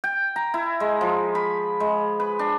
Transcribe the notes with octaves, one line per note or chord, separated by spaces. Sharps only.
G5
A#5
E4
G#3
F3
B5
G#3
B4
D4